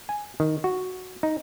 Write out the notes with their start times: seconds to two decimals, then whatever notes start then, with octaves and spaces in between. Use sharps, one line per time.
0.09 G#5
0.40 D#3
0.64 F#4
1.23 D#4